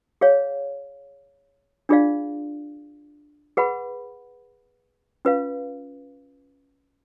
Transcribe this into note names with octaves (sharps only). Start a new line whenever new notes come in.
G#4 C#5 F5
D4 F4 G#4 D5 F5
G#4 B4 F#5 B5
C#4 F4 B4 F5